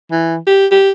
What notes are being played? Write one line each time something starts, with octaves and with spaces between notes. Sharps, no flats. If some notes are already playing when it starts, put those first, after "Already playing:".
E3
G4
G4